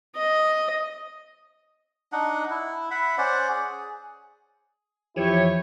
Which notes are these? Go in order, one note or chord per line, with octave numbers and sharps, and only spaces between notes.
D#5
D4 D#4 F#5
E4
E5 F#5 B5
C#4 C5 D5 F#5
G#4
F2 E3 F3 E4 G4 C#5